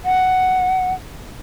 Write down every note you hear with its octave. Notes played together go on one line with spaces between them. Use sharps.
F#5